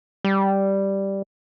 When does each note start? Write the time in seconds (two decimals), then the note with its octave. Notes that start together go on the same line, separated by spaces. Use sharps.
0.25 G3